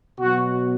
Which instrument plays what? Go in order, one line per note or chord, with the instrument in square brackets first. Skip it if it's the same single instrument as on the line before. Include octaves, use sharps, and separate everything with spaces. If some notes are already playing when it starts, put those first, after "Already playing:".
[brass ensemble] B2 F#3 F#4